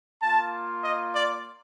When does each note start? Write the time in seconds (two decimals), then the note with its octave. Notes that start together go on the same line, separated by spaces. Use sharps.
0.22 A#3 F4 A5
0.84 D#5
1.14 D5